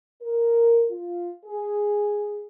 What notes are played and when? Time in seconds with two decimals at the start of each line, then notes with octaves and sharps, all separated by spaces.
0.22 A#4
0.90 F4
1.44 G#4